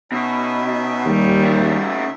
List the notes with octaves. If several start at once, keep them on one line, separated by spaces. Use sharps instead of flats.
B2 C#4 D#4 E5
D#2 G3
C#3 E4